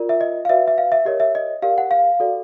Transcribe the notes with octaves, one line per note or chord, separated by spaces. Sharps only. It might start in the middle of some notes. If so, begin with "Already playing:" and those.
Already playing: F4 A#4 D5
E5
D#5
F5
F#4 B4 D5 E5
E5
F5
E5
G4 A#4 C#5 D#5
E5
D#5
G4 A#4 D5 F5
F#5
F5
F#4 A4 D5